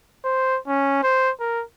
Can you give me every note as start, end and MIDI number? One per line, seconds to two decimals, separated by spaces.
0.25 0.58 72
0.68 1.02 61
1.03 1.31 72
1.40 1.64 70